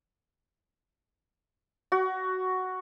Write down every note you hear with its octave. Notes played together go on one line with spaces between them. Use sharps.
F#4